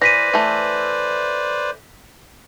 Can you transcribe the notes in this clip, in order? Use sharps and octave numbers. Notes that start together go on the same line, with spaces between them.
E3 B4 C5 D5 A#6 B6 D#7
E3 A3